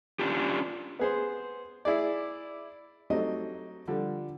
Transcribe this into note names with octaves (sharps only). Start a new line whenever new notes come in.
C#4 D4 F4 G4
B3 G#4 C5
E4 G#4 D5
F#3 A3 C4 D#4 G4 D#5
D3 F3 G3